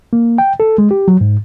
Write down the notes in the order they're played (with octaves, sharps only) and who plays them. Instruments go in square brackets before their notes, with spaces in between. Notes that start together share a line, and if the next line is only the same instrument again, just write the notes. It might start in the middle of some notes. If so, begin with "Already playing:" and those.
[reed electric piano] A#3
G5
A4
G#3
G4
F#3
G#2